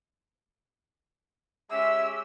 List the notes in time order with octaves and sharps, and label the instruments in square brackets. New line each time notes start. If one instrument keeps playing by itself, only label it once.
[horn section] G#3 C#4 G4 [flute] E5 [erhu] E6